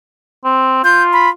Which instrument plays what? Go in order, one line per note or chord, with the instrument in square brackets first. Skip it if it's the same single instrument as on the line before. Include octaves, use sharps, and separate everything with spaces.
[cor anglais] C4
[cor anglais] F4 [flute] G6
[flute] B5